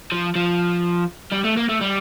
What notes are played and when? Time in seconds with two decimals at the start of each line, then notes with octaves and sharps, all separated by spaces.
0.12 F3
0.35 F3
1.32 G3
1.45 A3
1.57 A#3
1.69 A3
1.81 G3